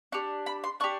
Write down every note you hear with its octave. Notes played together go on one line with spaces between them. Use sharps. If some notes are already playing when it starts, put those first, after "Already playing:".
D4 G4 C#6
B5
C6
D4 G4 C#6